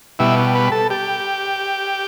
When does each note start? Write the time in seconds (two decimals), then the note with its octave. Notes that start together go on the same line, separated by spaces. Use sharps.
0.19 B2 G3 E4
0.55 B4
0.72 A4
0.90 G4